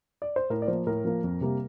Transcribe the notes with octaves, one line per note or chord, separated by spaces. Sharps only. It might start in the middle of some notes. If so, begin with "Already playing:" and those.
D5
C5
A2 A#4
D5
F3 A#3 C5
A2 A#4
F3 A#3
F2
C3 G3 A#3